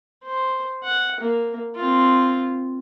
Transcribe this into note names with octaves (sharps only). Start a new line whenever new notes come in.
C5
F#5
A#3
C4 F4